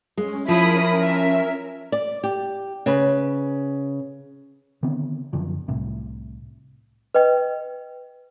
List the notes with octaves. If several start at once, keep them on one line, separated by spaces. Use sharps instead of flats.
G#3 C#4
F3 C#4 E4 A#4 B5 D#6
E5
D5
G4
C#3 B4
D3 D#3 B3 C4
F#2 D3 F3
C2 A2 C3
B4 D#5 G5